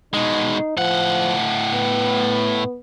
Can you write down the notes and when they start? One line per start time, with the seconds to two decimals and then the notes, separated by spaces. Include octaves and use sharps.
0.14 B2 G#3 D#4
0.77 A2 F3 F#5
1.73 B3